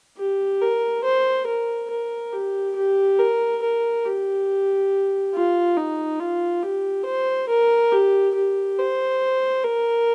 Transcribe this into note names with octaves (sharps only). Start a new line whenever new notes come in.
G4
A#4
C5
A#4
A#4
G4
G4
A#4
A#4
G4
F4
D#4
F4
G4
C5
A#4
G4
G4
C5
A#4